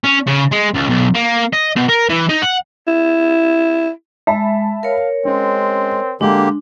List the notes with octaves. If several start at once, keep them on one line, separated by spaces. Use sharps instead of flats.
C#4
C#3
G#3
C#2
B1
A#3
D#5
B2
A#4
E3
D#4
F#5
E4
G#3 E5 A5 B5
A#4 C#5 F5
G#3 C4 C#4
D3 G#3 A#3 D4 G4